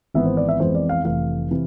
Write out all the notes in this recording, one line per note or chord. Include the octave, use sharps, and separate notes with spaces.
G#1 G#2 E3 B3 E5
C5
D5
E5
F2 E3 G#3 B3 C5
D5
F5
F1 F2 E3 A3 F5
C3 E3